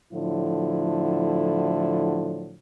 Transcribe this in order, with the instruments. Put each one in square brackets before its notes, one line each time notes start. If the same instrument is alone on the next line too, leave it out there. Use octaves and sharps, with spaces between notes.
[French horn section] A2 D3 F3 F#3 E4